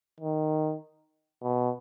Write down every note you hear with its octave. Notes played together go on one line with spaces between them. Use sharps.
D#3
B2